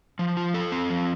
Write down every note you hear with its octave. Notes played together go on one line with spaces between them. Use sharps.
F3
F4
A4
C4
F3